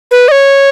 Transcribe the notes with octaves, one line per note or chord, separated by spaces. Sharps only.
B4
D#5
C#5